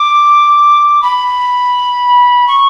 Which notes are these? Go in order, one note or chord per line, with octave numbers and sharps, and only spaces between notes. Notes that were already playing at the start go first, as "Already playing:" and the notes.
Already playing: D6
B5
C#6